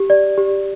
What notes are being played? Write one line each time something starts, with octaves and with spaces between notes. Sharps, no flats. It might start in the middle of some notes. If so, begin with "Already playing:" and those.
Already playing: G4
D5
G4